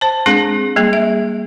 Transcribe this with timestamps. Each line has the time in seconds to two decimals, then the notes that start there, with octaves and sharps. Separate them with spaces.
0.01 C5 A5
0.26 G#3 C4 D4 G#4
0.76 G3 A#3 G#4
0.93 E5